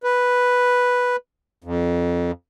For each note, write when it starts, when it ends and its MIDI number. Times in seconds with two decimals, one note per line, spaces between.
0.03 1.16 71
1.64 2.31 41